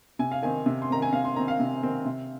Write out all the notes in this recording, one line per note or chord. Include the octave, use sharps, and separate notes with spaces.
C3 G#5
F5
D#3 C4 G#5
C3
C6
D#3 C4 A#5
G#5
C3 F5
C6
D#3 C4 A#5
F5
C3
D#3 C4
C3